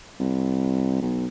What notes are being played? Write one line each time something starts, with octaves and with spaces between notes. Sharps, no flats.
C2
B1